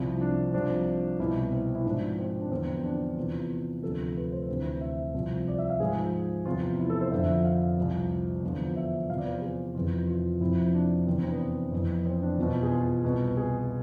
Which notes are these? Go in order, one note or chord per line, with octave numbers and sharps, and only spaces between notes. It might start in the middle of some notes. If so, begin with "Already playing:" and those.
Already playing: C2 C3 F3 E4
D4
C2 C3 F3 D4
C2 B2 E4
C4
E4
G#2 F3 D4
C4
D4
E2 D3 F3 C4
D4
E2 C3 E3 F4
D2 C3 F3 A4
B4
C5
D2 C3 E3
E5
C2 C3 F3
D5
E5
F5
G#2 F3 G#4
E2 C3 F3 F4
E4
A4
C5
F2 D3 F3 E5
F5
C2 C3 F3
E2 D3 F3
E5
E2 C3 F3 F5
D5
B4
C5
G#4
F2 C3 E3 F4
F4
F2 C3 F3 E4
C4
D4
E2 C3 E3 C4
D4
C4
B3
F2 E3
C4
D4
E2 B2 F4
G#4
F4
C2 B2
G#4